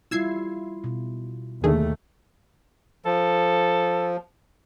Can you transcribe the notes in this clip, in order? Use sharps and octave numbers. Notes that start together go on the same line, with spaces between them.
G3 E4 F4 E6 G#6 C7
B2
D#2 D3 D#3 A3 G#4
F3 A4